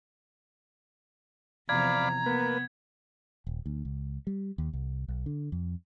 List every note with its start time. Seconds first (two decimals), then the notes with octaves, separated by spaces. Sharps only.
1.69 E2 C3 F3 D5 F5 A#5 B5 G#6
2.26 A#3 B3 B4
3.47 D#1
3.66 D2
3.85 C#2
4.27 G3
4.58 D#2
4.73 C2
5.08 B1
5.26 D3
5.52 F2